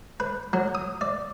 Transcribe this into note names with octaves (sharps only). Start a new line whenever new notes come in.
B4
F#3
D#6
D5